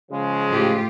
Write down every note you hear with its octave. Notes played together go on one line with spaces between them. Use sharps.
C#3 F3 G#3
A2 F4 G4